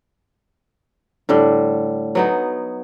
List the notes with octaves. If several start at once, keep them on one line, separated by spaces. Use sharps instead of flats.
A2 D3 G3
F#3 B3 D#4